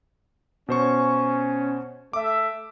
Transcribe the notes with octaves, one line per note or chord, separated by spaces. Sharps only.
B2 C#4 C5 C#6
A3 E5 D6